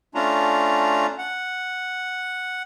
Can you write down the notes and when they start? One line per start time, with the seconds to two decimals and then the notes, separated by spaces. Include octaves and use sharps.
0.15 A3 C#4 D4 F4 A#5
1.19 F#5